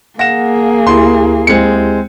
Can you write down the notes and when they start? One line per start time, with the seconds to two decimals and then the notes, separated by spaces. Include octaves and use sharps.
0.19 A#3 G#4 F5 F#5 A#6 E7
0.87 D2 E4 G4 C6
1.47 G#3 C4 C#7